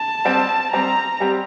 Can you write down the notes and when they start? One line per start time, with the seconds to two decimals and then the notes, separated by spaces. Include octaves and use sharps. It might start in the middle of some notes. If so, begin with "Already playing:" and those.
Already playing: A5
0.25 G3 C4 G4
0.72 G3 C4 G4 A#5
1.20 G3 C4 G4